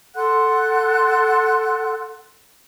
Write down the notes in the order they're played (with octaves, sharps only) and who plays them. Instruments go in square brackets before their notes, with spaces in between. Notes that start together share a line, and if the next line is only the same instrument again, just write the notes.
[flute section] A4 F#5 C6 F#6